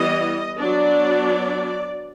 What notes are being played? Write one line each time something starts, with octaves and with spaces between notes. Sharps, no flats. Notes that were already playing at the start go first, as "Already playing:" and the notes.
Already playing: E3 G3 B3 D#5
F#3 B3 D4 D5